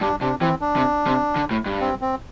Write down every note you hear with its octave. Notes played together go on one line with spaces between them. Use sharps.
G2 D4
C3 D4
E3 C4
D4
C3
C3
D3
A2
G2
C4
C4